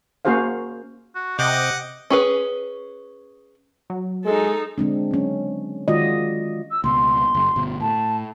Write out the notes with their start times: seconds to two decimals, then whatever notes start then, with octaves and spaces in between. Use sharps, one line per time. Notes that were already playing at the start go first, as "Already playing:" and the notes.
0.25 A#3 C#4 F#4 G#4 C5 F5
1.15 F#4
1.39 C3 D#5 F#5 G5 D6
2.10 C#4 G#4 B4
3.90 F#3
4.25 G#3 D#4 A4
4.78 D3 G#3 C4 D4
5.11 F#3 C#4
5.88 D#3 G#3 F4 F#4 D5 D#5
6.70 E6
6.84 C#2 B2 C6
7.34 F#1
7.56 G1 B2
7.81 A2 A5